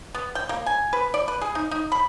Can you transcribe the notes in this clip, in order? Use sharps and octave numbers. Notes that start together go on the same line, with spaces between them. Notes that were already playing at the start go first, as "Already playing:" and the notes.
B3
G5
A#3
G#5
B4
D5
B4
G#4
D#4
D#4
B5